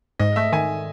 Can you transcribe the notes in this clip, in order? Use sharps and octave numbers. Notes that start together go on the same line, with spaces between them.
G#2 D#5
A3 E5
D#3 G#5